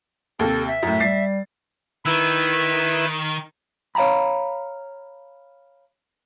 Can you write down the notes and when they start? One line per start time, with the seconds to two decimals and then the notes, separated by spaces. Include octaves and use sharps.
0.39 D#2 C3 A4
0.67 E5
0.83 F#2 A2
1.00 G3 A6 C7
2.05 D#3 E4 B4 E5
3.95 C#5 F5 G#5 A#5 B5